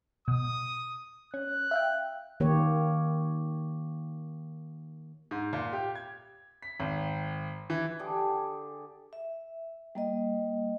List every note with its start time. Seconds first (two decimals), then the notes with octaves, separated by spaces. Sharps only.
0.28 B2 D#6
1.34 C#4 F#6
1.71 E5 F5 G5
2.40 D#3 A#3 G4 C#5
5.31 G#2
5.53 A#2
5.73 G4
5.95 G#6
6.62 B6
6.80 G#1
7.70 E3
7.99 D3 G4 G#4
9.13 E5
9.95 G3 A#3 D#5